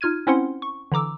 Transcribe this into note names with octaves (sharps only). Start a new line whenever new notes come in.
D#4 F4 F6 G#6 D#7
C4 C#4 E4 C5 F#5 C6
C#6
D3 E3 A#5 D6 E6